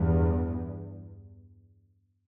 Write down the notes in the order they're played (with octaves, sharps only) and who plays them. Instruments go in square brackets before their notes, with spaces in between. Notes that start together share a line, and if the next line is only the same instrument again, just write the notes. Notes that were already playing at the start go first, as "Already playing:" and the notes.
Already playing: [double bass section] E2 G2